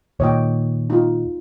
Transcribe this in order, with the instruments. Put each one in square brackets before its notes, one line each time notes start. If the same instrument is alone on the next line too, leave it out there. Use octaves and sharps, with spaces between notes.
[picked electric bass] D#2 A#2 [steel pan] C#5 D#5 G5
[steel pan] D#4 F4